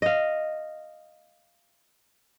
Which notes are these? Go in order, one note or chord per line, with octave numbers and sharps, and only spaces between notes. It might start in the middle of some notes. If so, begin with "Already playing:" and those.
D#5 F5